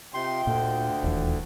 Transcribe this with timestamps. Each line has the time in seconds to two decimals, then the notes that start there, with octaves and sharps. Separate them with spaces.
0.14 C3 F4 D#5 G5 C6
0.47 D2 A#2 D3
1.04 D#1 E2